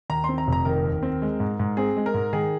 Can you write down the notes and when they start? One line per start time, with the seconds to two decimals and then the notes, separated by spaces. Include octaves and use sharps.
0.10 D#2 A#5
0.24 C4 C6
0.38 A#5
0.47 F1
0.52 A#5
0.65 D#3 A#4
0.84 D#2
1.03 C4
1.22 G#3
1.40 G#2
1.60 G#2
1.77 C4 G#4
1.97 G#3
2.06 A#4
2.14 G#2
2.33 D#3 G#4